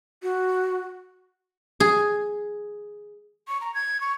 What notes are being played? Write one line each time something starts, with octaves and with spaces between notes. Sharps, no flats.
F#4
G#4
C#6
A#5
G#6
C#6